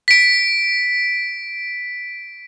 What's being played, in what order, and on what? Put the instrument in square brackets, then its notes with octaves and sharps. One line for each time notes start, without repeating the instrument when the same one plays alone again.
[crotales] B6 D7